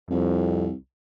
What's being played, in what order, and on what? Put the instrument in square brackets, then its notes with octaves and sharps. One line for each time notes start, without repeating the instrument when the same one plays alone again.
[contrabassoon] C2 [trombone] F2